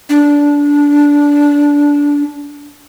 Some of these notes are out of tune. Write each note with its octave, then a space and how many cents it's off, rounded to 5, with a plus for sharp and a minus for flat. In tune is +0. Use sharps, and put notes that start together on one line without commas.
D4 -20